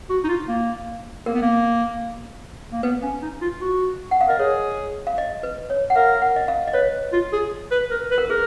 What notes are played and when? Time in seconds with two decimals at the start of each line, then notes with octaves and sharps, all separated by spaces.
0.10 F#4
0.24 D#4
0.29 F4
0.48 A#3
1.26 A#3 A#4
1.34 B3
1.42 A#3
2.72 A#3
2.83 B3 B4
3.03 C#4
3.22 D#4
3.42 F4
3.61 F#4
4.11 F#5
4.21 F5
4.28 A#4 D#5
4.39 G#4 C#5
5.07 F5
5.18 D#5
5.43 B4
5.70 C#5
5.90 F#5
5.96 A#4 F5
6.22 F#5
6.36 D#5
6.48 F5
6.67 D#5
6.73 B4 C#5
7.13 F4
7.33 G#4
7.71 B4
7.91 A#4
8.11 B4
8.18 A#4
8.30 G#4 A#4